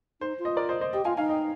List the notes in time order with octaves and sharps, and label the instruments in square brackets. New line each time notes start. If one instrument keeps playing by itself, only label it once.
[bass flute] D#4 [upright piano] C5
[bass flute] F4
[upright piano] D#5
A#4 D5
C5 D#5
C5 D#5
[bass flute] G4 [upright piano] D#5 G5
[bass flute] F4 [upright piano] F5 G#5
[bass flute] D#4 [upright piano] F5 G#5
[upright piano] D#5 G5